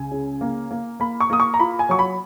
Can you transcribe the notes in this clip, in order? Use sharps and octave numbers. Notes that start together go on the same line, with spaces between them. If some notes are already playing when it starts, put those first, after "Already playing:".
Already playing: C#2 G#5
C#3
A#3
A#3
A#3 B5
C#6
A#3 D#6
C#6
A#5
F4 B5
G#5
F#3 C#6
B5